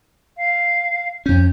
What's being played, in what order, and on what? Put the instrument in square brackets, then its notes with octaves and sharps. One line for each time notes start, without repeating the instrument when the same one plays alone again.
[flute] F5
[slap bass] F2 C#4 [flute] G6